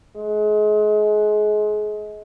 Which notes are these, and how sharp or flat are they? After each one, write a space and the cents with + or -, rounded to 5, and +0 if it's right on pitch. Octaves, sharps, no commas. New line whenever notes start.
G#3 +30